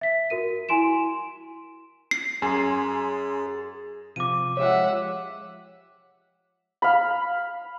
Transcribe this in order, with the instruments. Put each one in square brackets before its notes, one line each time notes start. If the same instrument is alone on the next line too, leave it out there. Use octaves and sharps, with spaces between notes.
[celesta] E5 B6
F#4 A#4 D#7
E4 G#5 C6 D7 E7
[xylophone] C7
[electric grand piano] F#2 G#5 C6 [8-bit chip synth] G#4
[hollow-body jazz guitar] C3 F3 [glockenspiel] D6 D#7
[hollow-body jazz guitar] F3 G#3 G4 [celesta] C#5 [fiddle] E5 F#5
[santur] F5 B5